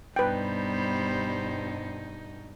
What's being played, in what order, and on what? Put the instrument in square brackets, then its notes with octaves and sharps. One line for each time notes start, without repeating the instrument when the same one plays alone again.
[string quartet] G2 B2 D#4 [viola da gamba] G3 B3 C5 [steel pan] B4 G5